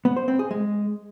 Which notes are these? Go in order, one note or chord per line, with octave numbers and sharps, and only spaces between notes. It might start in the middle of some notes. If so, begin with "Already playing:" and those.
B3
C5
C4
G#4
G#3